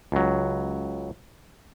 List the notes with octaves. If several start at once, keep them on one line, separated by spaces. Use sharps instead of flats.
C#2 F#3